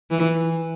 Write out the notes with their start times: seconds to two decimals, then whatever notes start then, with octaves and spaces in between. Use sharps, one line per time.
0.11 E3